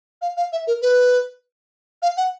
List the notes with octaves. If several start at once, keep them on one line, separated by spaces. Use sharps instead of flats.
F5
F5
E5
A#4
B4
F5
F#5